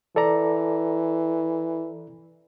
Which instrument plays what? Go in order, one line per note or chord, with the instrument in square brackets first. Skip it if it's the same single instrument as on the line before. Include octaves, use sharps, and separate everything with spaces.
[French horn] E3 [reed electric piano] A4 D5 A#5